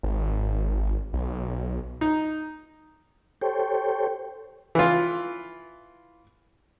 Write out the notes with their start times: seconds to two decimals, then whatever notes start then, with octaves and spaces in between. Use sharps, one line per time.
0.03 G#1
1.13 B1
2.01 D#4
3.41 G4 A4 C5 C#5 G5
4.75 E3 F4